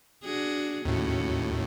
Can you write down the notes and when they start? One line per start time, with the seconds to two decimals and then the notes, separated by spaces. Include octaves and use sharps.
0.24 D4 F#4 G#4
0.85 D#2 A2 C#4 F#4